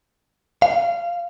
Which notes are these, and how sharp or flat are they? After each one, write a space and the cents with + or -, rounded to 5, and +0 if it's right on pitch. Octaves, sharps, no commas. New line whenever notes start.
F5 -25